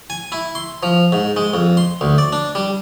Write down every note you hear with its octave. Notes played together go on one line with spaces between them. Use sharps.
G#5
E4
C6
F3
G#2
G#3
F2
C6
D2
D5
D4
G3